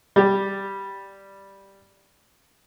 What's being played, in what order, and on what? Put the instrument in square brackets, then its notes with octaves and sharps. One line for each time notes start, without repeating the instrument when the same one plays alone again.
[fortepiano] G3 G4